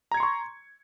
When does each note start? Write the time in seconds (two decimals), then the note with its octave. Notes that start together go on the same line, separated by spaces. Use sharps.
0.12 A#5
0.14 G#6
0.17 C#7
0.20 C6
0.23 C#6